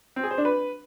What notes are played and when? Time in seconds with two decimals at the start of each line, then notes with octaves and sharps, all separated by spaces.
0.16 C4
0.24 G#4
0.31 C5
0.38 D4
0.45 B4